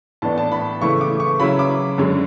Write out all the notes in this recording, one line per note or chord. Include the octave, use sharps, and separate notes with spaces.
A2 E3 B3 D4 A5
A5
B5
C#3 E3 A3 E4 C#6
D6
C#6
C#3 F#3 C#4 E4 B5
D6
F#2 D3 G#3 C#4